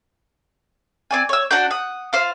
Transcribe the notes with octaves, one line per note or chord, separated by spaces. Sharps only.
C4 D5 G#5
C#5 E6
D4 F#4 F#5 G6
F#5 D#6
F4 C5 F5